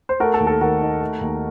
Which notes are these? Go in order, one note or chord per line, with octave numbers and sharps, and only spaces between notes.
C5
A3 F#4 A#4
A4
D#2
A4
D#3 F#4 A#4
D#4
A3
D#2